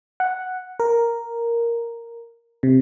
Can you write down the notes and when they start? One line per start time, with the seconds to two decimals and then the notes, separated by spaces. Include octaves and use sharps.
0.20 F#5
0.80 A#4
2.63 C3